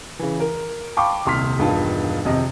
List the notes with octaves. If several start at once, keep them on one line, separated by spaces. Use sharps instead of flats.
C#3 E3
A#4
F5 G5 A5 B5 C#6 D6
D#1 C2 C3 C6 F6 B6
E1 G2 D#3 F4 A5
G#1 F2 C3 D#5